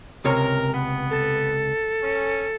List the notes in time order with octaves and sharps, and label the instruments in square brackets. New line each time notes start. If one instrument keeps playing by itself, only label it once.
[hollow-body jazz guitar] C#2 C3 C#5 [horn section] A#4
[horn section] B3
[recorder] A4
[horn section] C#4